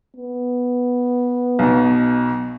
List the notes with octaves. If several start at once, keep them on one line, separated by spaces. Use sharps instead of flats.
B3
B1 B2